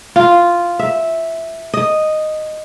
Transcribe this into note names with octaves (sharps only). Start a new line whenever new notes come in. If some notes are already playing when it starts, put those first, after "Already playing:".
F4
E5
D#5